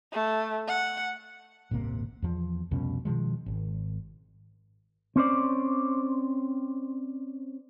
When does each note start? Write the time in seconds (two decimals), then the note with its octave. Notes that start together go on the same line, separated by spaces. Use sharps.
0.12 A3
0.68 F#5
1.71 D#1 G#1 C3 A#3
2.22 E2 F3
2.71 C2 F2 B2 C#4
3.05 B2 D#3 F3 G#3
3.46 G#1
5.16 C4 C#4 C5 D5